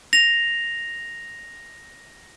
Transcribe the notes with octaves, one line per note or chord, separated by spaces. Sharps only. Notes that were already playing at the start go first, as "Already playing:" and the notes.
A#6 F7